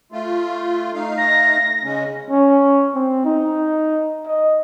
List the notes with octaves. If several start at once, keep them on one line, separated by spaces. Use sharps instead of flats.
A3 F4
A3 D#4 F5
A#6
C#3 G#3 C#4
C#4
C4
D#4
D#5